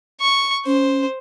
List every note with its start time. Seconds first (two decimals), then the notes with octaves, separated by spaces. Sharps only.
0.21 C#6
0.66 C#4 C5